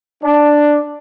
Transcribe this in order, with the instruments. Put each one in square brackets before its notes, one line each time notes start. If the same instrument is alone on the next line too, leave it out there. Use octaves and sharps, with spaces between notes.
[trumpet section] D4